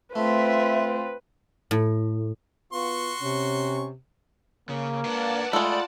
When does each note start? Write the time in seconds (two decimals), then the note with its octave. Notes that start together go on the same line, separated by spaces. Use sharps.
0.15 A3 C4 F4 B4 E5
1.71 A2
2.73 B3 F4 F#4 C6 C#6
3.21 C3 C#4
4.69 C#3 A#3
5.05 B4 D5 F5 F#5 A5
5.53 G#3 A3 F4 B5